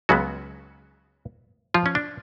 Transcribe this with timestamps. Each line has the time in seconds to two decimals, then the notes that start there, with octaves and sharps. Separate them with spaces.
0.09 C#2 C#3 F#3 G#3 B3 F#4
1.74 F3 F4
1.86 C#4
1.95 D4